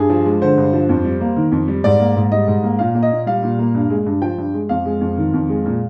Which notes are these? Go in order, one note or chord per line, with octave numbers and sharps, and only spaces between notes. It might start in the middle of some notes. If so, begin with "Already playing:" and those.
Already playing: G2 G#4
F3
G#3
D3 C5
G2
F3
F2
G3
A#3
D#3
F2
G3
G#2 D5
A#3
G#2
G3 D#5
G#2
A#3
A#2 F5
A#3
D#5
A#2
G3 F5
A#2
A#3
G2
G#3
G2
F3 G5
G2
G#3
F2 F5
G#3
F2
D#3
F2
G#3
A#2